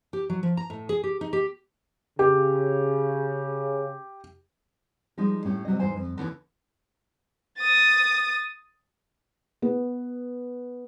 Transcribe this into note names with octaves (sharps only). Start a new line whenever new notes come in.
G4
F#3
F3
A#5
A2
G#4
G4
D#4
G4
C#3 G4
F3 G3 G#3 D#4
A2 C#4 G4
C3 F#3 G3 D#5
E2 G#2 D#4 C5 G#5
F2
D#2 D3 E3 C#4
D#6 A6
B3